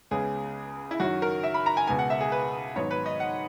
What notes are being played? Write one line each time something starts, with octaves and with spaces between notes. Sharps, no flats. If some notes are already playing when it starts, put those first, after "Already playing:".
C#2 C#3 G#3 B3 G#4
E4
F#2 D#3 F#3 F#4
A#4
E5
B5
A#5
G#5
C#2 B2 G#3 B3 G#5
F#5
E5
G#4
B4
G#1 G#2 F#3 B3 C#5
B4
D#5
F#5